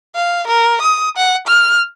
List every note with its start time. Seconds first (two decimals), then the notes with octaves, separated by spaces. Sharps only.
0.15 F5
0.47 A#4
0.81 D#6
1.17 F#5
1.47 F6